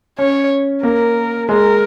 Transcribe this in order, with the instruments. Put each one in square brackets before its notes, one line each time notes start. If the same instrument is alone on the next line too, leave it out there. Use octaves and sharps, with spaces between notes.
[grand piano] C#4 [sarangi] C#5
[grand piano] A#3 [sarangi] A#4
[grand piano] G#3 [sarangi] A#4